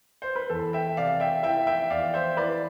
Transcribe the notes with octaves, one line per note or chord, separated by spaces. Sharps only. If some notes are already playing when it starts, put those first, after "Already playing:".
C5
B4
E2 A4
E5 G5
C3 D5 F5
E5 G5
E3 E5 G5
E5 G5
E2 D5 F5
C5 E5
E3 B4 D5